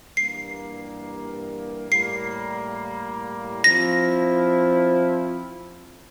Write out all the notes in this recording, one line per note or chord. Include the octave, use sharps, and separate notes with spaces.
G2 E3 G3 A#3 C7
A2 G3 A#3 C7
F3 C4 E4 A#6